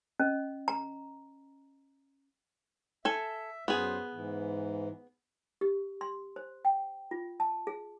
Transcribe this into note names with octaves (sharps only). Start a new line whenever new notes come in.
C#4 D#5
A#5
A4 E5 G#5
F#2 B3 G#4 C5
G#2 E3
G4
C6
C5
G5
F4
A5
G#4